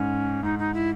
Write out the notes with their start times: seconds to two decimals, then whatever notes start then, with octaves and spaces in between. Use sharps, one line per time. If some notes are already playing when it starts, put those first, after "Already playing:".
Already playing: G#2 C#4
0.43 G#2 D#4
0.59 D#4
0.74 E4